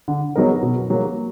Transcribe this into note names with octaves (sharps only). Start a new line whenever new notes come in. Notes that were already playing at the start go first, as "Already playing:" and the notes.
D3
F#3 B3 D#4 A#4
B2
F#3 A#3